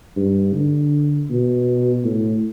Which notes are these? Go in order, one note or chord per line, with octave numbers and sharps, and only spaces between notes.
G2
D3
B2
A2